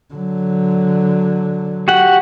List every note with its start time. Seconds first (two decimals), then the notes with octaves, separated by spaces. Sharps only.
0.14 D3 F#3
1.88 F#4 G4 F#5